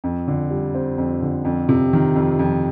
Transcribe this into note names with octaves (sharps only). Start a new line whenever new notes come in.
F2
D3
G3
C4
F2
D3
F2
C3
D#3
F2
F2